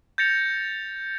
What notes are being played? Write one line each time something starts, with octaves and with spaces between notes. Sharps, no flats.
G6 A6 A#6 C#7 F7